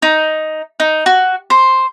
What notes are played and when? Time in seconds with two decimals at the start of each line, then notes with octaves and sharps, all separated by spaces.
0.02 D#4
0.80 D#4
1.06 F#4
1.50 C5